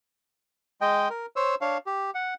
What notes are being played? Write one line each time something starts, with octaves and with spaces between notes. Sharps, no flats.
G#3 D#5 G5
A#4
C5 C#5 E6
D4 C#5 F5
G4
F#5